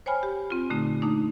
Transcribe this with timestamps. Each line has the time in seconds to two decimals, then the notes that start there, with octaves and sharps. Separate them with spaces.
0.06 C5 C#5 G5 G#5 B5 F6
0.23 G4
0.50 C4 F4
0.70 A#2 D3 A3 D#4
1.02 A3 A#3 D4 D#4